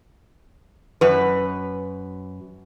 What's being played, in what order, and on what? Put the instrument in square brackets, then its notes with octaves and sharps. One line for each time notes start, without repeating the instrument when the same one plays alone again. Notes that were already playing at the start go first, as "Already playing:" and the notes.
[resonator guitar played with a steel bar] F#2 B4